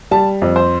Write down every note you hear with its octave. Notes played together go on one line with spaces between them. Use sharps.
G3 A5
F2
C5